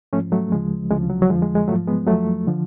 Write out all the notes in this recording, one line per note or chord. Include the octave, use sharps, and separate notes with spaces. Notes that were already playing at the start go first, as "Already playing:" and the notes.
G#2 F3 A3 C#4
F#3 A3
D2 C#3 F3 G#3
D2 C#3 F3 G#3
F#3
F#3
F2 D3 F3 G#3
G#3
G#3
G#2 F3 F#3 A3
G#3 B3
F2 F3 F#3 A3
D3 F3